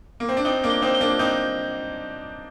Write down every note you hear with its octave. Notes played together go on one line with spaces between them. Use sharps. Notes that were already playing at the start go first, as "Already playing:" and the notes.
A#3
C4
D4
C4 D#4 G7
A#3 D4
G7
C4 D#4
G7
A#3 D4
C4 D#4 G6